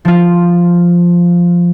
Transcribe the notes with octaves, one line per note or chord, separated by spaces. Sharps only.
F3 F4